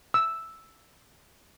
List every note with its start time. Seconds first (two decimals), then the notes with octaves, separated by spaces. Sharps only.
0.14 E6